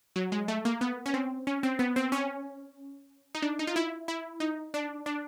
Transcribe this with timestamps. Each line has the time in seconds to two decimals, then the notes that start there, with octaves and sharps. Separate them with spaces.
0.16 F#3
0.32 G#3
0.48 A3
0.65 A#3
0.81 B3
1.06 C#4
1.14 C4
1.47 C#4
1.63 C4
1.79 B3
1.96 C4
2.12 C#4
3.35 D#4
3.42 D4
3.59 D#4
3.67 F4
3.76 E4
4.08 E4
4.40 D#4
4.74 D4
5.06 D4